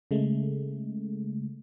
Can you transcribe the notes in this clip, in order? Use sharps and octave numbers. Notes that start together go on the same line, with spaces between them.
C#3 G#3 A3